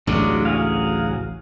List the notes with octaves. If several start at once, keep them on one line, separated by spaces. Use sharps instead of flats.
A1 D2 C#3 F#3 G#3 D4
F#3 G#4 F5